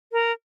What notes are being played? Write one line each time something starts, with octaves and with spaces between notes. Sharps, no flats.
A#4